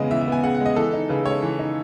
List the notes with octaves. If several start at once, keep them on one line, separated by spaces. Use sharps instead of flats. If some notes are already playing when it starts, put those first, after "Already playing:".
Already playing: C#3 E3 G#3 B3 D#5
E3 E5
E5
B3 G#5
C#3 F#5
F#5
G#3
D#5
E3 A4
D#4
C#3 B4
G#3 C#5
E3
D#4